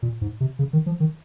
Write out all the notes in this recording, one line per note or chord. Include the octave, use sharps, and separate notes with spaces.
A#2
G#2
C3
C#3
D#3
F3
D#3